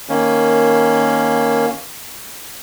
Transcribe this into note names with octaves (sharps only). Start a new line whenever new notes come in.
D#3 A#3 C#4